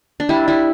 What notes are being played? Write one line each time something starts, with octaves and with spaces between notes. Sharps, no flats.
D4
G3 E4
G3 E4